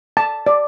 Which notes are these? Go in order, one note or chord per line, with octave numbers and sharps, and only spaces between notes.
A5
D5